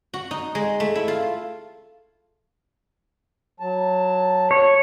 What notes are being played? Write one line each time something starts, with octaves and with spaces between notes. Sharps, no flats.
F#4
D#4
G#3
A3
E4
F4
F#3 A5
C#5